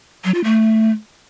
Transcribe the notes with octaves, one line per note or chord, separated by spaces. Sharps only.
F#3
F4
A3